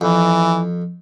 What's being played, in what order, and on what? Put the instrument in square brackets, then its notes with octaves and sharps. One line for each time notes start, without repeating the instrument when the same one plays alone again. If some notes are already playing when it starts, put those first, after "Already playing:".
[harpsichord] F2 [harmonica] E3